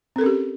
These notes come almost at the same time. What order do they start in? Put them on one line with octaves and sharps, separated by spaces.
C4 A4 A#4 C#4 G4